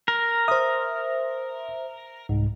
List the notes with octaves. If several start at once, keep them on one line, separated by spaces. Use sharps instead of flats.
A#4
C5 E5 D#6 F6
C2 G#2